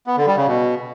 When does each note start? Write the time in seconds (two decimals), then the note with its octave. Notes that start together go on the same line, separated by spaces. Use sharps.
0.07 B3
0.17 D3
0.27 G3
0.37 C#3
0.47 B2